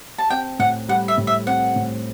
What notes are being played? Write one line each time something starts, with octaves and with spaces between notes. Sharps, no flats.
A5
C4 G5
A2 F#5
G3 F#5
E5
A2
E5
C4 F#5
A2